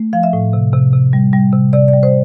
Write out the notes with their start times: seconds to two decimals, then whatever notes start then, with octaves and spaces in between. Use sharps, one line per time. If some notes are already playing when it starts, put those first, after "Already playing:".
Already playing: A3
0.13 F3 F5
0.23 E5
0.33 A2
0.53 C3
0.73 C3
0.93 C3
1.13 G3
1.33 G3
1.53 C3
1.73 C3 D5
1.88 D5
1.93 G3
2.03 C5